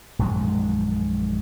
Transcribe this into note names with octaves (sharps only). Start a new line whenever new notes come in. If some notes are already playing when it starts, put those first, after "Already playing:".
A#1 F#2 D#3 G#3